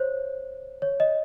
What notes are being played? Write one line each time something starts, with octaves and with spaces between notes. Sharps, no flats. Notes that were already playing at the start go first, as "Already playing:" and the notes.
Already playing: C5 C#5
C#5
D#5